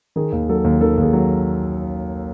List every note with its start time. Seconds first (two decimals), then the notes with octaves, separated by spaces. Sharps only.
0.16 D#3 G#4
0.32 D#2
0.49 F#3 A4
0.64 D#2
0.81 D#3 A4
0.97 D#2 G#4
1.13 F#3